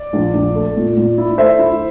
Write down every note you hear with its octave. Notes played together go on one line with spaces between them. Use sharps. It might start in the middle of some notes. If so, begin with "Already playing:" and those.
Already playing: D5
A#1
A#1
A3
A#2
A#2
E4
A3 C5 E5
E4